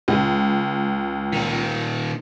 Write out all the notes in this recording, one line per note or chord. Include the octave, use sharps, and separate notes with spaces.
C#2
A#2 D#3